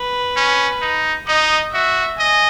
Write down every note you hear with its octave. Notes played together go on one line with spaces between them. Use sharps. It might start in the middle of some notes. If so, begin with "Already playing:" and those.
Already playing: B4
C#4
D#4
D#4 D#5
F#4 E5
D#5 G#5